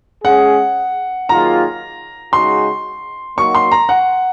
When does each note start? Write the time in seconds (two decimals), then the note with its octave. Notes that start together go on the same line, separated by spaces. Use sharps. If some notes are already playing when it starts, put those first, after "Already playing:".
0.24 G#3 C#4 G#4 F#5
1.29 D#3 F#3 A#3 F4 G#4 A#5
2.33 C#3 G#3 D#4 F#4 C6
3.37 F#3 A#3 D#4 F#4 C#6
3.55 C6
3.72 A#5
3.89 F#5